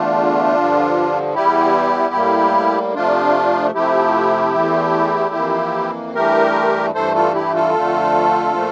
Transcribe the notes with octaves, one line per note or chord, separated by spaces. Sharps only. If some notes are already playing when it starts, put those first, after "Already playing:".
Already playing: E2 D3 A3 D4 F4
G2 D3 F3
E2 E3 G3 E4 G4
A2 G3 A#3
C3 F3 A3 D4 F4
C3 F3 A3 E4 G4
E2 E3 A3
F2 E3 A#3
G2 E3 A3 G4 A#4
G2 E3 A3 A4 C5
F4 A4
E4 G4
F4 A4
F2 D3 A3
A#2 F3 A3